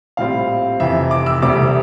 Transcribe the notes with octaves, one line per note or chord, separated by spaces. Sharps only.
A#1 A2 G3 C4 F4 F5
F1 F2 C3 E3 E5
D6
E6
E1 D2 C3 G3 D6